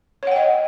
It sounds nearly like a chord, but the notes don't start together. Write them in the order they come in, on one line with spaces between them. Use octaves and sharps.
C#5 F#5 G5 D#5